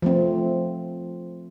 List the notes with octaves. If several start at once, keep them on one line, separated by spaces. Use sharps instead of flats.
F3 A3 C4